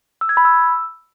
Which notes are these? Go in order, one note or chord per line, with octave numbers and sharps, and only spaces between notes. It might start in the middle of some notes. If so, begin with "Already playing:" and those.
E6
G#6
B5
E6